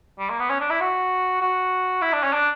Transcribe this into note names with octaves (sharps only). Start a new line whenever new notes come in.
G3
A#3
B3
C#4
D4
E4
F#4
F#4
E4
D4
C#4
D4